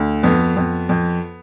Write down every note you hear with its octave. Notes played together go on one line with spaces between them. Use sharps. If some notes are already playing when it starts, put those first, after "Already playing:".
Already playing: D2
F2 B3
F2
F2